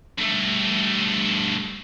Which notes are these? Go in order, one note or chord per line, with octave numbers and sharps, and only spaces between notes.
G2 A3